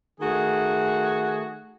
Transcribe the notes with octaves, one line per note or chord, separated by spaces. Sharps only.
D#3 A3 F#4 G#4